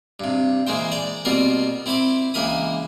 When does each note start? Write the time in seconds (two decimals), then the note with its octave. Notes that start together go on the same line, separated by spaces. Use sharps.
0.20 G2 C3
0.67 E3 G#3 A#3 C5 G5
0.92 D5 A#5
1.25 B2 G3 A#3 C4 F4 A#4
1.86 C4 E4 C5 B5 D6
2.34 C#2 E3 A#3 A#4 B5 D#6